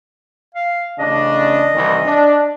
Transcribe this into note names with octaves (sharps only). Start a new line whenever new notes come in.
F5
A1 C#3 D4 D#5
C2 D#3 E3
D4